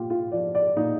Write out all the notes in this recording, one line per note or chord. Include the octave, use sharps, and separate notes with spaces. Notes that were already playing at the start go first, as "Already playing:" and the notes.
Already playing: A#2 F4 G4
F4
F3 D5
D5
A#2 D#4